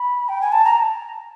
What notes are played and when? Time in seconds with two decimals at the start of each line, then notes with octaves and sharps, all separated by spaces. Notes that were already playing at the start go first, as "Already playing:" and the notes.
Already playing: B5
0.29 G5
0.41 G#5
0.52 A5
0.65 A#5